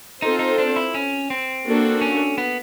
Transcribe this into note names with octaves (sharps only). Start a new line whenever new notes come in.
C4 D#4 F4 A4 C5
D#4
D4
E4
C#4
C4
A#3 D4 F#4 A4
C#4
B3